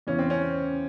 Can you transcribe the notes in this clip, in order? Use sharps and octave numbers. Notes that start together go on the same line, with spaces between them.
E2 C#3 E3 C#4
C4
C#4